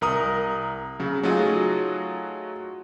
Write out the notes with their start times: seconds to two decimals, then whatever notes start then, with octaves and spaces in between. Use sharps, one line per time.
0.01 C2 A#4 A#5 D#6
0.99 C#3 F#3
1.23 F#3 A3 D#4 F4 F#4 G#4